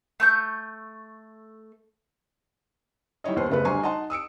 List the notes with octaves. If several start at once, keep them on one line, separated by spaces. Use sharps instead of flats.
A3 C#6 G6
G3 D#4 E4 C#5 D#5
D#2 B3 C5
F#1 C#3 A3 B3 B4
D2 G3 C5 G#5 A#5 C#6
D#4 D#5 F#5 A5 C6
D#6 E6 C#7 D7